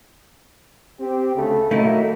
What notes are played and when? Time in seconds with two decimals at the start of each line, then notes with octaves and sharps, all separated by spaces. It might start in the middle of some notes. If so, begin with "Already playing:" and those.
0.99 C4 G4
1.34 D2 C#3 A3
1.71 D#3 F#3 A3 A#3 D#4 E4